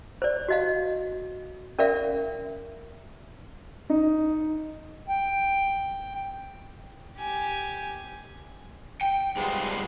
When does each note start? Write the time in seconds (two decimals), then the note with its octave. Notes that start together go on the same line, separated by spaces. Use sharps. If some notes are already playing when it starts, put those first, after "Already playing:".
0.22 C5 D5
0.48 F#4 D#5 F5
1.79 C#4 A#4 D5 E5 F5
3.90 D#4
5.08 G5
7.17 G4 G#5
9.01 G5
9.36 G#2 G3 G#3 B3 F4